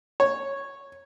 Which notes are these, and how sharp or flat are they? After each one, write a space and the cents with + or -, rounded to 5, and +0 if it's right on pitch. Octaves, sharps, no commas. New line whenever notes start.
C#5 -10